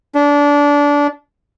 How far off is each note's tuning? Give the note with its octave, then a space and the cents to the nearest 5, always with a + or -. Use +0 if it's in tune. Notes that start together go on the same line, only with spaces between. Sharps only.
D4 -25